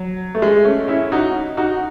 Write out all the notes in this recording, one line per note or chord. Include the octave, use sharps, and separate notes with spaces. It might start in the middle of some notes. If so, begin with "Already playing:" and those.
Already playing: F#3
A3
G#3
A3 C#4
C#4 E4
D#4 F#4
D#4 F#4